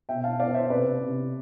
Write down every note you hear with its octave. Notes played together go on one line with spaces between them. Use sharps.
B2 E5 G5
F5 A5
B3 D5 F5
C5 E5
C3 B4 D5
C3